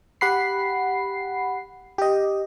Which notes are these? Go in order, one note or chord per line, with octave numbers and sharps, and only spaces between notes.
G4 F#5 B5 C7
G4 D#5